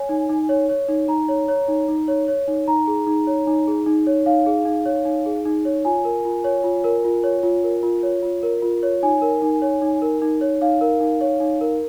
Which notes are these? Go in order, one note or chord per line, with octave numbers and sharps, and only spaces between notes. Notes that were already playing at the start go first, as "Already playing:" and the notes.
Already playing: C#5 G#5
D#4
D#4
C#5
C#5
D#4
D#4 A#5
C#5
C#5
D#4
D#4
C#5
C#5
D#4
D#4 A#5
G#4
D#4
C#5
D#4
G#4
D#4
C#5
D#4 F5
G#4
D#4
C#5
D#4
G#4
D#4
C#5
F4 G#5
A#4
F4
C#5
F4
A#4
F4
C#5
F4
A#4
F4
C#5
F4
A#4
F4
C#5
D#4 G#5
A#4
D#4
C#5
D#4
A#4
D#4
C#5
D#4 F5
A#4
D#4
C#5
D#4
A#4